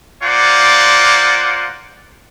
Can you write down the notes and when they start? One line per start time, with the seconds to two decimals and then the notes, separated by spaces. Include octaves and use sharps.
0.23 A#3 F4 C5 D5 F#5